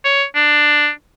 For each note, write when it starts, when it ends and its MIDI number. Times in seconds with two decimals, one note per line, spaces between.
0.05 0.24 73
0.35 0.89 62